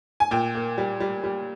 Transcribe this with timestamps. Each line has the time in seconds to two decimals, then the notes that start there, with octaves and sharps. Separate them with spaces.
0.20 G#5
0.31 A#2 G5
0.55 A#3
0.78 G3
1.00 G3
1.24 G3